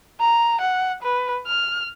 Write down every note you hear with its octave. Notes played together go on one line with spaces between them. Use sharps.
A#5
F#5
B4
F6